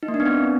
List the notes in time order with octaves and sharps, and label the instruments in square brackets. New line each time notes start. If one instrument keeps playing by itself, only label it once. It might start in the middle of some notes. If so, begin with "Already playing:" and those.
[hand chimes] D#4
A#3
D4
B3
C4